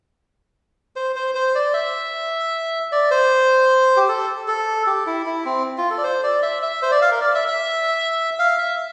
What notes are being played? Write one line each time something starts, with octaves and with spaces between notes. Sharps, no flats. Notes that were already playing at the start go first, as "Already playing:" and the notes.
C5
C5
C5
D5
E5
D5
C5
G4
A4
A4
G4
E4
E4
C4
F4
A4
D5
C5
D5
E5
E5
C5
D5
F5
A#4
D5
E5
E5
F5
E5